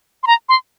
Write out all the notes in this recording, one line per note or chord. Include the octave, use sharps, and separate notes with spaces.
C6
A#5
C6